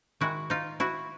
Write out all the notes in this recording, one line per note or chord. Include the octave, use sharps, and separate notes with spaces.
D#3 G#3 E4 F#4
D#4 F4
E4 F#4